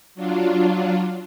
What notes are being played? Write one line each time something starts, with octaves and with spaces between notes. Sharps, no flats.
F#3 D4 F4